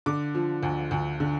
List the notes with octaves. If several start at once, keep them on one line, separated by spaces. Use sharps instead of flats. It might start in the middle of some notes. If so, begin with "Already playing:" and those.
D3 D6
F3
D2
D2
D3